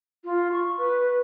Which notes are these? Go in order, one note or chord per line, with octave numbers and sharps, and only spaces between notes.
F4
C#6
B4